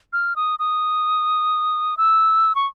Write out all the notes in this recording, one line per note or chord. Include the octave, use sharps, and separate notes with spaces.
F6
D#6
D#6
E6
C#6